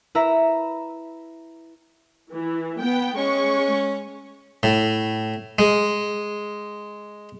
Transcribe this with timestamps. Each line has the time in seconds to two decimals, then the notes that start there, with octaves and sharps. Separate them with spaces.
0.15 E4 B4 E5 A#5
2.33 E3
2.80 B3 G5
3.17 G#3 C#4 C#6
4.63 A2
5.59 G#3